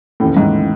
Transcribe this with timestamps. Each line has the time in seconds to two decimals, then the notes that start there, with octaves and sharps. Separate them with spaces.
0.20 D#2 A2 C#3 E3 A3 C#4
0.37 G#2